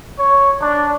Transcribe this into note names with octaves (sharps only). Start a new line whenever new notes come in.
C#5
D4